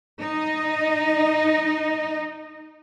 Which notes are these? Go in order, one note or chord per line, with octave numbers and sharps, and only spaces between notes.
D#4 D#5